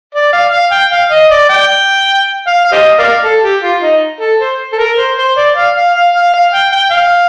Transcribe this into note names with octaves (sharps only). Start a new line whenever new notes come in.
D5
F5
F5
G5
F5
D#5
D5
G5
F5
F5
G4 C5 D#5
A#4 D5 F5
A4
G4
F4
D#4
A4
C5
A4
A#4
C5
C5
D5
F5
F5
F5
F5
F5
G5
G5
F5